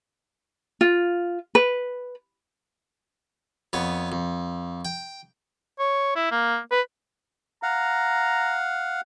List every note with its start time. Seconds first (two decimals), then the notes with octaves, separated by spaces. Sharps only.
0.81 F4
1.55 B4
3.73 F2 B3 C#5
4.12 F2
4.85 G5
5.79 C#5
6.15 E4
6.31 A#3
6.71 B4
7.63 F5 F#5 A#5